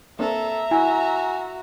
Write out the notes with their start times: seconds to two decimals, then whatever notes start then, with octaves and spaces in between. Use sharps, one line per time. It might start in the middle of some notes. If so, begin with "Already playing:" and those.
0.19 A#3 C4 D4 A4 E5 A#5
0.71 E4 F#4 G#5